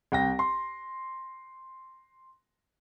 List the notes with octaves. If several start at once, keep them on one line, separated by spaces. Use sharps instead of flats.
C2 G5 A#6
C6